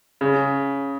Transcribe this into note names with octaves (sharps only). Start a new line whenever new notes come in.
C#3